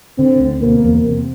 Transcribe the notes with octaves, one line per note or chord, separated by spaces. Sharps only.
D3 C4
D2
B2 A#3
E2
C3